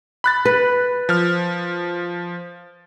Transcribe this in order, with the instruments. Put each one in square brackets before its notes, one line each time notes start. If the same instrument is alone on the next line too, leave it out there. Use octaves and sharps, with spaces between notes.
[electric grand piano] B5 F#6 A6
[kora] B4
[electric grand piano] F3 F6